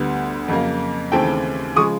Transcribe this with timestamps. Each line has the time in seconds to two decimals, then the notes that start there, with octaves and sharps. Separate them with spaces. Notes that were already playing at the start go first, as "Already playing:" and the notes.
Already playing: D2 D3 G3 B3
0.48 F2 C#3 F#3 A#3
1.12 D#2 C#3 E3 A3 C4 G5 A5
1.76 C#3 F3 G#3 C#6 D#6